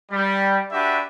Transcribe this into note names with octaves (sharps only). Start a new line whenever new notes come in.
G3
D4 F#4 G4 B4 E5